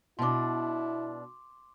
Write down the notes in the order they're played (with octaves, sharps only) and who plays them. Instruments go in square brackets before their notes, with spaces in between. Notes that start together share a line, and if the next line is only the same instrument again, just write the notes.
[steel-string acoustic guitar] B2 D4 [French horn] E4 [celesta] C6 D6